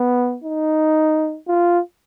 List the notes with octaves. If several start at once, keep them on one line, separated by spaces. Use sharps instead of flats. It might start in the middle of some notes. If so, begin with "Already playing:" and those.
Already playing: B3
D#4
F4